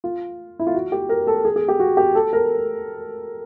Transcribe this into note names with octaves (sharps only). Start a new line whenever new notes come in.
F4
E4
F4
F#4
G4
A#4
A4
G#4
G#4
G4
F#4
G4
A4
A#4